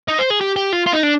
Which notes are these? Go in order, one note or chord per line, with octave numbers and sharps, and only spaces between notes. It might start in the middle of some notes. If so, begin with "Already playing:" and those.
D#4
C5
G#4
G4
G4
F4
F4
D#4
D4